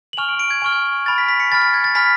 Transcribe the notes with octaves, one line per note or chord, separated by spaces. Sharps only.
F#7
G#5 C#6 F6 F7
D7
D7
G#6
G#5 C#6 F6
G#6
G#5 B5 F6 A6
B6
B6
C#7
G#5 B5 F6 A6
A6
G#6
A6
G#5 B5 F6 B6